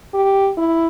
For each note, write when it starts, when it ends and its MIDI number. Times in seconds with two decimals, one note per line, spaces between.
0.14 0.50 67
0.57 0.88 64